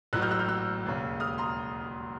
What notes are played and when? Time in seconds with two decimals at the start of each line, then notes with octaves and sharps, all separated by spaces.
0.13 A1 A2 F#3 E6 F#6
0.22 F6 G6
0.31 E6 F#6
0.39 F6 G6
0.49 E6 F#6
0.85 E1 D#2 C#3
1.20 D#6 F6
1.38 A#5 C6